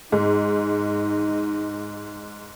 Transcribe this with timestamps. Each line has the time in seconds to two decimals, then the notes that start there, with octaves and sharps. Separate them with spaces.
0.12 G#2 D#4